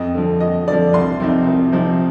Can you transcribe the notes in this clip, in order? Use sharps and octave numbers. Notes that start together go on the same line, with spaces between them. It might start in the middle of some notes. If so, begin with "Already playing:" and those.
Already playing: F2 D#5
D3 F3
F2 D#5
D3 F3 D5
C2 C6
C3 F3 C4 D#4
C2
C3 F3 C4 D#4